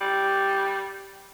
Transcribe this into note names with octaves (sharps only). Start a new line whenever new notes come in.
G3